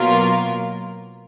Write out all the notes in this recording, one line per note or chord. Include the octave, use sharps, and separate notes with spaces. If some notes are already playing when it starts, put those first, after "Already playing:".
Already playing: B2 F#3 A#3 F4 A#4